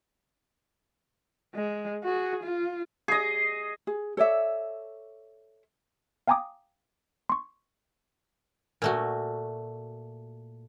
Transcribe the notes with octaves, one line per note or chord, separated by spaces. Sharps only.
G#3
F#4 G#4
F4
G#4 D#5
G#4
A4 C#5 D5 E5
F5 G5 G#5 A#5 D6 D#6
C6 C#6
A#2 A3 F#4